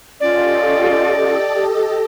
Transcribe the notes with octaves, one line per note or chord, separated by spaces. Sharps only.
C#4 F4 G4 A4 D5 D#5